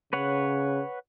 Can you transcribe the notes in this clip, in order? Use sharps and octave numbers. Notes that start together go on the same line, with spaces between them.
C#3 B4 C#5 F#5